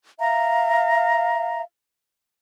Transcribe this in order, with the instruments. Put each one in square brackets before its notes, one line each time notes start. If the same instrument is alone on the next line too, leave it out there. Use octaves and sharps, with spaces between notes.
[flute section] E5 F5 A#5